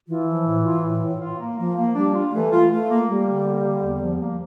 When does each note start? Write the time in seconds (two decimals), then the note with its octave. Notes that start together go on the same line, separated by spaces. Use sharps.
0.08 E3 F4
0.28 F3
0.46 A2
0.65 F4
0.83 A2
1.03 A2
1.20 F4
1.39 A#3
1.59 F3 A#3
1.77 A#3
1.95 G3 D4
2.14 F4
2.33 E3 A3
2.52 F4
2.71 A3 F4
2.90 A#3
3.08 G3 A#3
3.27 D3
3.46 A#3
3.65 D3
3.83 E2
4.01 F3
4.21 A#3